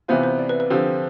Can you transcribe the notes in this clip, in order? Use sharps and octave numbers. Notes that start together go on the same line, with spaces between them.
C3 E3 B3 F4 C5
C5
D5
B4
B4
D3 F3 C4 G4